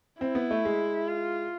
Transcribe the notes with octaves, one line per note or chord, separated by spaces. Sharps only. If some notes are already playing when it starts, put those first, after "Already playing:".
C4 E4
B3
A3
G#3
F4